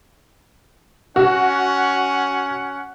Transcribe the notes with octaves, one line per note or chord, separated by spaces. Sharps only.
C#4 F#4 F#5